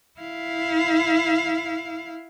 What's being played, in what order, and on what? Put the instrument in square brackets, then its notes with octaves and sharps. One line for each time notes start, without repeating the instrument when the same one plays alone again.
[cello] E4 F5